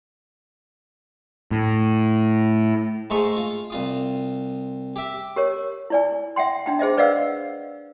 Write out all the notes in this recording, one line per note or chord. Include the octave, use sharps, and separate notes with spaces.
A2
G#2 A3 A#5 C6 C#6 D#6
F4
C2 F4 D#6
G4 E5
G4 A#4 C#5
E4 D5 G#5
E5 F#5 G5 C6
D4 D#4 G5
G#4 C5 D#5 E5
B4 D5 D#5 F5 F#5 E6